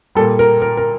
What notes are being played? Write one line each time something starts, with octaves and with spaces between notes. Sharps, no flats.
A#2 G3 A4
A#4
A#4
A#4